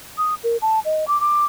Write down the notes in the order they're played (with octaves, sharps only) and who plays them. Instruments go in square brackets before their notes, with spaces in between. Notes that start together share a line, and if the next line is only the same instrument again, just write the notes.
[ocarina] D#6
A#4
A5
D#5
D6
D6